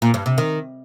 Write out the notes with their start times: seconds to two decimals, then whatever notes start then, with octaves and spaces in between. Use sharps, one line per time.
0.02 A#2
0.14 G2
0.26 C3
0.38 D#3